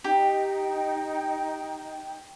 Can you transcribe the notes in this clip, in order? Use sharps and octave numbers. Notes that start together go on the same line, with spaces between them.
D#4 G4 G5